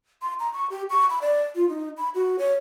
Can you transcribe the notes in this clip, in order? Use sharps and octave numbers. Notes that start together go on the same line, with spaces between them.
C6
A#5
C#6
G4
C#6
B5
D5
F4
D#4
B5
F#4
C#5